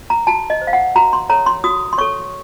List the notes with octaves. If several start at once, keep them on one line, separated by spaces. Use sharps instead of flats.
A#5
F#4 A5
D#5
C5
F5
F#5
F#4 A#5
C6
A4 C#5 A#5
C6
F#4 D#6
C6
A4 C#5 C#6